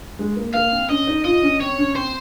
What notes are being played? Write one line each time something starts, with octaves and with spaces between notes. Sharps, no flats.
G#3
A#3
A#3 F5
C4
C#4 D#5
D#4
F4 D#5
C#4
C4 C#5
C#4
C4 C5